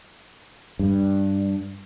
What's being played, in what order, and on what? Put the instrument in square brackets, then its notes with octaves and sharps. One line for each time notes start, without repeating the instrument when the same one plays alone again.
[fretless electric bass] G2